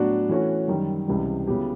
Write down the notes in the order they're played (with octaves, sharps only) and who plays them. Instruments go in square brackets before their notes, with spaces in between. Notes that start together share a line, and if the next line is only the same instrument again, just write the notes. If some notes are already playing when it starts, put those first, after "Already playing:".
Already playing: [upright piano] A2 F#3 B3 D4 F#4
E3 A3 C#4 F#4
F#2 D#3 G3
C#2 C3 E3 G3
C#3 F#3 B3 E4 G4